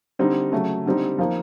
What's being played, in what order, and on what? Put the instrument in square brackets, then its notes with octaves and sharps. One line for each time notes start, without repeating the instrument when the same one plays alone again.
[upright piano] D3 G3 C4 D#4
C#3 F#3 A3
D3 G3 C4 D#4
F3 A#3 D#4